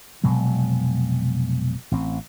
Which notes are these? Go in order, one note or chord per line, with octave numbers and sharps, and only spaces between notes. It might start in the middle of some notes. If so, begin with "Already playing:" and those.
F1 B2 F#3 G#3
A1 C4